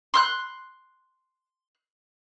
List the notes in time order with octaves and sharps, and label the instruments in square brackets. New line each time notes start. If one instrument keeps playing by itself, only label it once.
[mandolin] C6 F6 F#6